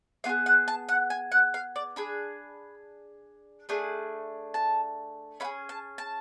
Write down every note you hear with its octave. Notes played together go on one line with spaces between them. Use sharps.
B3 F4 F5
G#4
F#5
A5
F#5
G#5
F#5
F5
D5
D4 G#4 B5
A3 D4 G#4
A5
C#4 F4 G#4 B5
A5
A5